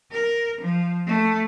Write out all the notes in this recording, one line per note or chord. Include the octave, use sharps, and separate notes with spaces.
A#4
F3
A3